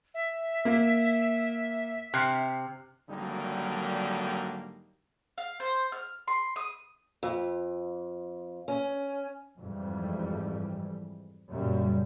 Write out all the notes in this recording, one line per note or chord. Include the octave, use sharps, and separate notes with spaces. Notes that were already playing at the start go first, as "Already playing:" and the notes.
E5
A#3
C3 F6 F#6 C7
G#1 D3 F#3 G3 A#3 D#4
F5
C5
F6
C6
D#6
F2
C#4
F2 G#2 E3 G3
F#2 A#2 C#3 G3